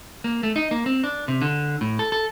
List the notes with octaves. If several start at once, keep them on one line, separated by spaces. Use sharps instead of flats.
A#3
A3
D#4
A#3
C4
D4
C3
D3
A2
A4
A4